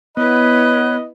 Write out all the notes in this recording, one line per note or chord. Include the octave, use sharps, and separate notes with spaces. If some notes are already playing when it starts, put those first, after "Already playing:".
B3 E4 B4 C#5 D#5 B5 F#6